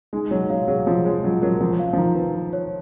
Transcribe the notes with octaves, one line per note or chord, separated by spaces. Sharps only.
G#3 D#4
F#3 C#5
F#3 F5
F#3 G#4
F3 F4
G#3 C#5
F#3 F4
F#3 A#4
F3 F4
F5
F3
D#3 A#5
B4
F4
C#5